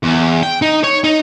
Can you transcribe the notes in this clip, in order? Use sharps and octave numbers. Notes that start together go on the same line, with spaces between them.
E2
G5
D#4
C#5
D#4